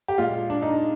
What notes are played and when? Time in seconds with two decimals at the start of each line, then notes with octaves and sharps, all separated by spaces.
0.08 G4
0.18 A#2 G#3 F4
0.50 D4
0.62 D#4